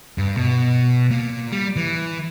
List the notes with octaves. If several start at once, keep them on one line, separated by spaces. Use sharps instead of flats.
G2
B2
A#2
G3
E3